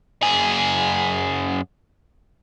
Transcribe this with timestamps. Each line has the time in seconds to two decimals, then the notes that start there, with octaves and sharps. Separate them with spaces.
0.22 F#2 G#4